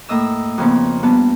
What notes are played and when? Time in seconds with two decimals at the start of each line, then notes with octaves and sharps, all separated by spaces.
0.09 A2 A#3 D#5 D#6 E6
0.58 F2 C#3 A#3 B3
1.03 G2 B3 A5